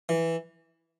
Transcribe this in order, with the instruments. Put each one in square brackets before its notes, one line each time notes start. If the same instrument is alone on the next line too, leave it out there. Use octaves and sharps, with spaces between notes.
[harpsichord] E3